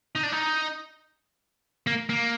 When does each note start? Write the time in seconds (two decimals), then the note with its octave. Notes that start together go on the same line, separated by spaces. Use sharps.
0.15 D#4
0.23 D4
0.32 D#4
1.87 A#3
2.09 A#3